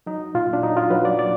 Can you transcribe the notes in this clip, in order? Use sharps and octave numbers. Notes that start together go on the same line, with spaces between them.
F#3 D#4
A#2 F4
D4
F#3 D#4
F4
F#3 B4
D5
A#2 D5